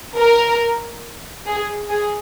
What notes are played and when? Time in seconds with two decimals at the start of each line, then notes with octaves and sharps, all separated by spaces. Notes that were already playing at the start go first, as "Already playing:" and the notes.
0.18 A#4
1.47 G#4
1.90 G#4